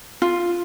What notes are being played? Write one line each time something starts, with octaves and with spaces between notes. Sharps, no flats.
F4